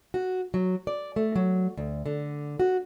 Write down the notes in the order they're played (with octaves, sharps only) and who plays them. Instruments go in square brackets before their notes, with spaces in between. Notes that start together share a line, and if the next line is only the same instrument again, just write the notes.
[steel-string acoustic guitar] F#4
F#3
D5
A3
F#3
D2
D3
F#4